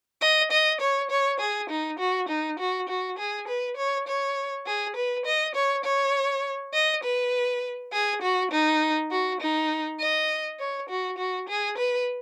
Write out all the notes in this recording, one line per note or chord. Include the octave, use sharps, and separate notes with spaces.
D#5
D#5
C#5
C#5
G#4
D#4
F#4
D#4
F#4
F#4
G#4
B4
C#5
C#5
G#4
B4
D#5
C#5
C#5
D#5
B4
G#4
F#4
D#4
F#4
D#4
D#5
C#5
F#4
F#4
G#4
B4